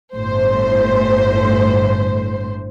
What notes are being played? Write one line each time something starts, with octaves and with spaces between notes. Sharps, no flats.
G1 A2 C5